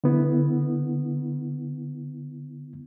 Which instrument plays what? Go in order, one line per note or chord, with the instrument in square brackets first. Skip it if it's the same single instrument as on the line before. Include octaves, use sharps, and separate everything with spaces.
[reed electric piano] D3 B3 E4